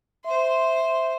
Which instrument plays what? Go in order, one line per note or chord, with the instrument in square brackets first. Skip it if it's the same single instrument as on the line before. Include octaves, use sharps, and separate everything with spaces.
[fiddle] C5 C6 [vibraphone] E5